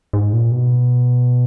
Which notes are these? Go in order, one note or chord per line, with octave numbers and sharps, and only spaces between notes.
G#2
A#2
B2